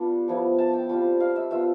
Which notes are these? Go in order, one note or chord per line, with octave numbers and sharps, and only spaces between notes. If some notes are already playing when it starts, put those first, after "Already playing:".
Already playing: G3 B3 D4 F4
F3 B3 E4
A5
G5
G3 C4 F4 G5
F5
E5
B3 F4 E5